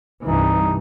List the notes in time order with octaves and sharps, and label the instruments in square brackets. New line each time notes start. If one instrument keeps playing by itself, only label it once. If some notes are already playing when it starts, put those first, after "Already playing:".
[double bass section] C2 G2 E3 [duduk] D#4